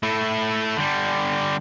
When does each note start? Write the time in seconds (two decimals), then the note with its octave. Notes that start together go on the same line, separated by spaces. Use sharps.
0.03 A3 E4
0.77 D3 G3